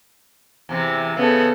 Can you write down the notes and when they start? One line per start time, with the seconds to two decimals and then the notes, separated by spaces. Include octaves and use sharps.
0.69 E2 C3 E3
1.17 C#3 B3 A4